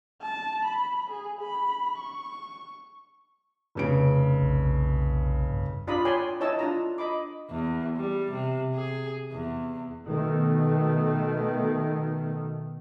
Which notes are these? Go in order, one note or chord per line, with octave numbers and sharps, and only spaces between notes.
A5
B5
G#4
B5
C#6
F1 C#3 D7
B1
G2
D4 F4 D5 A#5 B5 D#6
C#5 D5 G5 G#5 B5 C6
E4 C#5 D#5 A5 E6
D4 F4 A#5
D#5 B5 D6
E2
G3
C3
G#4
E2
B2 D#3 A3